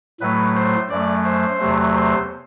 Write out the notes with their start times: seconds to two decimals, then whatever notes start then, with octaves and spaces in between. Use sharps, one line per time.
0.21 A2 F#3 A3 B4
0.56 C5
0.89 F#2 F#3 A3 D5
1.24 C5
1.59 E2 C3 F#3 A3
1.94 C5